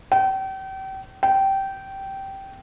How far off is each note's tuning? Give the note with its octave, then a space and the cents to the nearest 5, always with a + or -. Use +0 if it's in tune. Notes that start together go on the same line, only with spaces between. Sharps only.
G5 -35
G5 -15